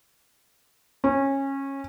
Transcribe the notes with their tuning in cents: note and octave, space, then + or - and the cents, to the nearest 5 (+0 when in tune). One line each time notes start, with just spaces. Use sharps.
C#4 -20